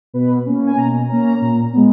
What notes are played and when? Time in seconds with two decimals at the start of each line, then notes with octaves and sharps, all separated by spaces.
0.14 B2 B4
0.46 A#3 C#4
0.67 G#5
0.77 B2 A#5
1.09 A#3 C#4 A#5
1.41 A#2
1.73 G#3 B3